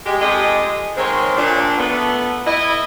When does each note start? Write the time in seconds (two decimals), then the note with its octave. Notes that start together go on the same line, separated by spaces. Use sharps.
0.06 G#3 G4
0.20 F2 G#3 G4 A4 D#5
0.97 D#3 G#3 A#3 C4 C5 C#5
1.37 A#2 D4
1.78 A3 B3
2.46 E4 D#5